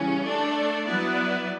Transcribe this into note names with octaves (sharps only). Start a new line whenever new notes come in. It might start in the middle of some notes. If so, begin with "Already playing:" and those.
Already playing: C#3 E3 G3 C#4
A3 D4 A4 D5
F#3 B3 E4 B4 D5